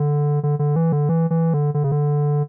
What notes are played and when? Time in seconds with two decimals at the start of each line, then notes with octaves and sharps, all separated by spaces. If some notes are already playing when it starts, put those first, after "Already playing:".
Already playing: D3
0.43 D3
0.59 D3
0.76 E3
0.92 D3
1.09 E3
1.30 E3
1.54 D3
1.74 D3
1.84 C#3
1.92 D3